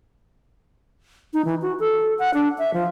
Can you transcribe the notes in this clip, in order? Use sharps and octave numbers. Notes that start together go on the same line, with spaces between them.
D#4
E3
F#4
A4
F#5
D4
E5
F3